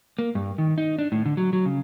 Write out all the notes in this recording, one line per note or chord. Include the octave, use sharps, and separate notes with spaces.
A#3
G2
D#3
D#4
D4
A2
D3
F#3
F#3
C#3